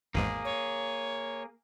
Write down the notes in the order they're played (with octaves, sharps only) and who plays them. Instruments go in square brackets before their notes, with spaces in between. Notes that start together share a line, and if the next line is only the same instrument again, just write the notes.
[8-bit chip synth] G#1 E2 G#2 [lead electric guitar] A#3 G#4
[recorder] C#5